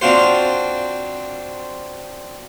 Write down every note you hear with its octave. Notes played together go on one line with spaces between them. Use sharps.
C4 D4 F4 F#4 C5